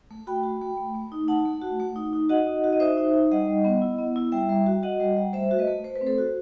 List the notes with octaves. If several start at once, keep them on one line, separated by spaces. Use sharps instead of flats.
A3
F#4 G5 B5
F#4
A3
A3
A3
D#4
D#4 F#5 A5
A3
F#4
A3
D#4
D#4
F#4 D#5 F#5
D#4
F#4
D#5
D#4 C5 E5
D#4
D#4
G3 D#5 F#5
G3
B3
E4
B3
E4
G3 E5 G5
G3
F#4
F#4 D#5 F#5
G3
G3
A3 C5 E5
F#4
B4 D#5
A3
A3 C5
B4
C4
A4 C5
F#4